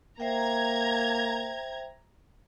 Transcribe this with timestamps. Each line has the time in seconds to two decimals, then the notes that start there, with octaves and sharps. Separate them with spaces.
0.20 A#3 C5 E5 G5 A#5 G#6